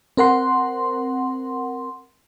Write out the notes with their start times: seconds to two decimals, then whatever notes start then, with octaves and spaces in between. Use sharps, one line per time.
0.17 C4 A#4 F#5 C6